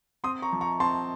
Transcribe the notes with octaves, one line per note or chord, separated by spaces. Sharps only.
C4 C6 D#6
A#5 C#6
F3
A#5 C#6
C4 A5 C6